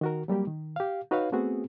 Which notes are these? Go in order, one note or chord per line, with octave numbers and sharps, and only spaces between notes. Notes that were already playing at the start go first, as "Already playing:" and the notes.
D#3 F#4 A#4
F#3 G3 A#3 G4
D#3
G4 F5
D#4 F#4 B4 C#5 F5
A3 B3 C4 F#4 G#4